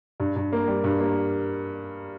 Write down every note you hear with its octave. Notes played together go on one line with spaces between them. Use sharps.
G2
G2
A#3
G3
G2
A#3